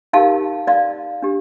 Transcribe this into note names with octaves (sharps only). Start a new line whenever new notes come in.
D#4 G4 A#4 F5 A5
D5 F5
D4 G4